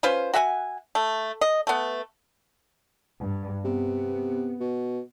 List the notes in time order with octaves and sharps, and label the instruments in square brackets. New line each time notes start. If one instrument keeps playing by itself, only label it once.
[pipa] C#4 F4 B4 C5
F#4 E5 F#5 G#5
A3
D#5
A3 B3
[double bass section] G2
[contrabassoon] C3 [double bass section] B3
[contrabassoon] B2